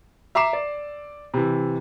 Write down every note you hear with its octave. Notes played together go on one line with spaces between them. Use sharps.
E5 A#5 D6 C7 E7
D5
C3 E3